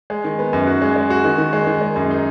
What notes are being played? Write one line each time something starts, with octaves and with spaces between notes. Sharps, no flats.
G#3
D#3
B3
F#2
F#4
G#3
G#3
F#4
D#3
D#3
G#3
D#3
G#3
F#2
D#4